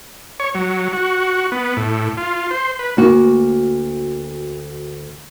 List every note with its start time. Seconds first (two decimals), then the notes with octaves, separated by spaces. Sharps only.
0.40 C#5
0.55 F#3
0.93 F#4
1.52 B3
1.77 A2
2.17 F4
2.51 C5
2.79 B4
2.97 D2 A#3 F#4